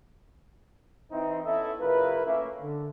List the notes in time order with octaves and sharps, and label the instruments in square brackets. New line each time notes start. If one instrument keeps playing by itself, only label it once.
[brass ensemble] E3 C4 D#4 E4
B3 C#4 E4 A4 D#5 E5
F#1 C#3 E4 F4 A#4 B4
A3 A#3 C#4 E5
D3